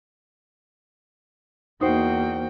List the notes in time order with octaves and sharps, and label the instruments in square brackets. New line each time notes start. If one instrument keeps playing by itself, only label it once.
[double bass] E2 A#3 [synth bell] D#4 C5 [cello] F#4 G5